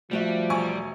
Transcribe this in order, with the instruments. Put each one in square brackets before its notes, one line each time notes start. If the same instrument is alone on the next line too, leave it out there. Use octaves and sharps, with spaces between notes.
[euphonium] F3 [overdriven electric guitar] G3 [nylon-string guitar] A3 F#4 E5
[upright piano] E1 G#5 C#6